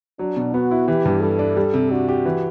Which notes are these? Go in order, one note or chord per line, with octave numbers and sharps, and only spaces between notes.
F#3 D4
B2
B3 F#4
E4
E3 G4
G2
G3 A4
D4
G3
C3
D4 F#4
G4
E3